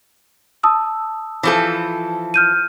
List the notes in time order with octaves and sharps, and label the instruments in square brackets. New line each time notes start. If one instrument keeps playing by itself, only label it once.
[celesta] A5 D#6 E6
[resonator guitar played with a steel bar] E3 F3 A4
[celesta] F6 G6 D#7